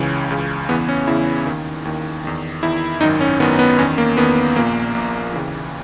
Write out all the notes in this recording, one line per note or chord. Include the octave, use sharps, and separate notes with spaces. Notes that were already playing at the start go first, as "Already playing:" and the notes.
Already playing: C#2 C#3 E3 C#4
C#2 C#3 E3
E2 C#3 E3 B3
C#4
E2 C#3 E3 E4
D#2 D#3
D#2 D#3
E2 D#3
E2 D#3 E4
G#1 F#2 D#3 D#4
C#4
G#1 F#2 D#3 B3
B3
E2 D#3 C#4
A#3
E2 D#3 B3
A#1 A#2 A#3
A#1 A#2
D#2 C#3 E3